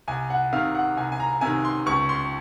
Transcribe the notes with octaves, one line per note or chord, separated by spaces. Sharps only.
C2 G#5
F#5
C3 D#3 F5
F#5
C2 G#5
G#5
A#5
C3 D#3 G#5
C6
C#2 C#6
C6